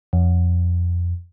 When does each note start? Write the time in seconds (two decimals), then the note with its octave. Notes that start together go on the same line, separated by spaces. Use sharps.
0.13 F2